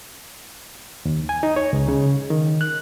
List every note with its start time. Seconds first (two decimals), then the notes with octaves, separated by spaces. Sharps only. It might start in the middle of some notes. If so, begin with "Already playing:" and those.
1.05 D#2
1.29 G#5
1.43 D#4
1.56 C#5
1.73 C#2
1.89 C#3
2.30 D#3
2.61 F#6